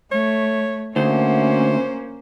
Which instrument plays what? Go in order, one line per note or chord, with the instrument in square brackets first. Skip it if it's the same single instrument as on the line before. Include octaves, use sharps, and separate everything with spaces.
[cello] A3 [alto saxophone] C#5
[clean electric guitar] D2 [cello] A#3 C#4 [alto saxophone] C5